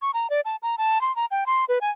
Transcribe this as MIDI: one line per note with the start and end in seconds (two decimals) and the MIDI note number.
0.02 0.11 85
0.14 0.30 82
0.30 0.41 74
0.45 0.56 81
0.62 0.76 82
0.78 1.01 81
1.01 1.14 84
1.16 1.26 82
1.31 1.44 79
1.46 1.65 84
1.69 1.79 71
1.81 1.90 80